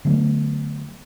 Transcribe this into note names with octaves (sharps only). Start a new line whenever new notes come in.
D3 F#3 A3 B3